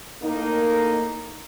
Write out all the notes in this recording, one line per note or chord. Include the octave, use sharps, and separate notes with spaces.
A2 A#3 D#4